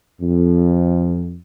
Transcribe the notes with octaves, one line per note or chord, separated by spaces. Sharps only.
F2